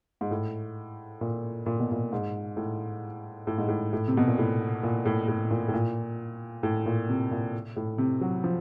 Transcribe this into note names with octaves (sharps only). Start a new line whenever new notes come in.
G#2
A2
A#2
A#2
B2
A#2
G#2
A2
A2
G#2
A2
A2
C3
B2
A#2
A2
A#2
A2
A2
A#2
A2
A#2
A2
A#2
C3
A#2
A2
C3
F#3
F3